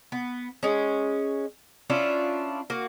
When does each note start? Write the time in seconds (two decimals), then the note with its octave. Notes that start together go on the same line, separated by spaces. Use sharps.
0.12 B3
0.63 G#3 C#4
1.90 C#4 D4 E4 F4
2.70 A#3 F#4